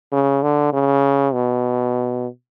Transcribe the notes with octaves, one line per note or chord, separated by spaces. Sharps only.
C#3
D3
C#3
B2